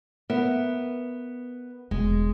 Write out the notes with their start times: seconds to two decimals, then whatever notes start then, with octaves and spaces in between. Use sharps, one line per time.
0.30 B3 A#4 E5
1.91 E1 G#3